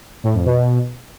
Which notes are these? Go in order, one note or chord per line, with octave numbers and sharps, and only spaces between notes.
A2
F2
B2